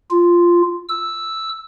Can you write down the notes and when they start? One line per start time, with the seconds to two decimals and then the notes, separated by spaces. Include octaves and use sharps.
0.10 F4
0.89 E6